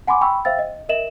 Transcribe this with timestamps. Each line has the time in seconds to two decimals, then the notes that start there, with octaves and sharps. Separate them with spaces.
0.07 F#5 G#5 B5 C6 D6
0.21 G5 B5 C#6 E6
0.45 C5 E5 F5 G5 E6 A6
0.59 D#5
0.89 A#4 D#5 E5 E7 F#7